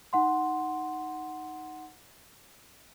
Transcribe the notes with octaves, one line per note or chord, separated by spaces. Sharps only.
D#4 F#5 C6